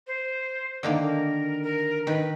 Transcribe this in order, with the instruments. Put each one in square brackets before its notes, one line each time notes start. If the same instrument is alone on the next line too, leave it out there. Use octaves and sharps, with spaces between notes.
[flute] C5
[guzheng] D3 D#3 A#3
[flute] A#4
A#4
[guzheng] D#3 [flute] B4